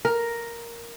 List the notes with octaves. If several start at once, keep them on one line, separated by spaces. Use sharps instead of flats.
A#4